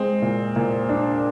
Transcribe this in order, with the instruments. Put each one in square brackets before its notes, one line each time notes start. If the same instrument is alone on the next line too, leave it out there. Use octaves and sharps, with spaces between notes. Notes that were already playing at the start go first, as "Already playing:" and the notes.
Already playing: [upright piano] G#3 [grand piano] C4
[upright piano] A#2
A#2
D4